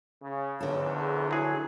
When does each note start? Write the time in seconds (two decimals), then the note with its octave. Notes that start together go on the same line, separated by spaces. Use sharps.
0.21 C#3
0.61 A#1 E2 D3 A4 C#5
0.99 G#4
1.31 F#3 E4 G#4